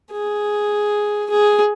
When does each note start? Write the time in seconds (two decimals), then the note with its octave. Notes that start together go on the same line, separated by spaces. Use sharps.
0.12 G#4
1.30 G#4